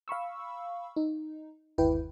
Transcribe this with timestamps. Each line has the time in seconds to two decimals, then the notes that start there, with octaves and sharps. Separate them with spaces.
0.08 F5 B5 C#6 E6
0.96 D#4
1.78 G1 D#2 E4 B4 G5